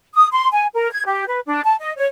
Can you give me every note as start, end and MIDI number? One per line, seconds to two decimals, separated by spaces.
0.15 0.27 87
0.32 0.48 84
0.52 0.66 80
0.74 0.90 70
0.91 1.03 92
1.06 1.24 67
1.27 1.40 71
1.46 1.61 62
1.64 1.75 81
1.80 1.92 75
1.97 2.06 73